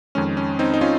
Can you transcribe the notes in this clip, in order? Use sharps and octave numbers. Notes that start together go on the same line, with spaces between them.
F2 D#3 G#3 C#4
C#4
C4 D#4
D#4
C#4 F4